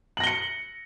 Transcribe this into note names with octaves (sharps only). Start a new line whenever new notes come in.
A#6 C#7 F#7 G7